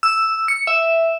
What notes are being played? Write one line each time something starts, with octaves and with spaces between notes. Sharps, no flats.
E6
C#7
E5